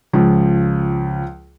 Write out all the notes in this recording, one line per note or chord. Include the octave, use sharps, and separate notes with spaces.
C#2 F3